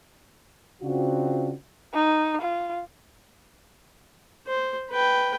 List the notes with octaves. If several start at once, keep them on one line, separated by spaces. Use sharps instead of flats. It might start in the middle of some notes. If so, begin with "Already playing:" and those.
C#3 C4 D4 F4 F#4
D#4
F4
C5
B4 G5